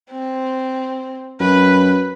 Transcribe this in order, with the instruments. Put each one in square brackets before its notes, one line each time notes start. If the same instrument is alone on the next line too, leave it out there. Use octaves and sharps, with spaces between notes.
[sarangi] C4
[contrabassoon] F#2 [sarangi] B4